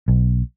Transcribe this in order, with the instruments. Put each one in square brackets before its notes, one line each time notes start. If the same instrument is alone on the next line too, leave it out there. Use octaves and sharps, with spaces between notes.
[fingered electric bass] B1